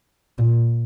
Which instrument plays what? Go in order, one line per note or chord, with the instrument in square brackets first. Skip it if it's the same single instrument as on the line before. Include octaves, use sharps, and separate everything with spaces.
[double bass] A#2